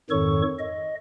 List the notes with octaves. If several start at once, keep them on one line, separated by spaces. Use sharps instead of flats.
F2 G#2 D#3 A4 C#5 C#6
D#5